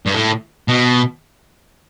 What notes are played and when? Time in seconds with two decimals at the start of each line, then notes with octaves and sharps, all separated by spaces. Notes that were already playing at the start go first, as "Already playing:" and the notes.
0.06 G2
0.14 A2
0.68 B2